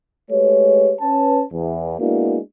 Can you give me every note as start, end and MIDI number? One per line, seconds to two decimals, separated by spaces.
0.31 0.94 56
0.31 0.94 57
0.31 0.94 67
0.31 0.94 71
0.31 0.94 73
1.01 1.43 61
1.01 1.43 71
1.01 1.43 81
1.52 1.99 40
1.99 2.39 56
1.99 2.39 58
1.99 2.39 59
1.99 2.39 62
1.99 2.39 64
1.99 2.39 66